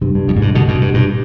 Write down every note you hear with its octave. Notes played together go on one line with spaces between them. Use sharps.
G2 C3
G2
F2
G#2
G2
B2 D3
G2 B2
G2
G2 B2